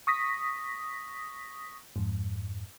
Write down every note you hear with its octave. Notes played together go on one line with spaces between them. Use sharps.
C#6 D#6 A#6 B6
F2 G#2